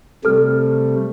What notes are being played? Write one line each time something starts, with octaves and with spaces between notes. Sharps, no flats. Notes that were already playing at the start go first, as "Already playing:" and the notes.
C3 G3 A3 A4 F6